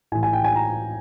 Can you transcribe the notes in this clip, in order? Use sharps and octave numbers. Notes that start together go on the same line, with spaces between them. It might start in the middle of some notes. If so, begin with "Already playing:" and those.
A2 E3 G#5
G#5
G5
G#5
A#5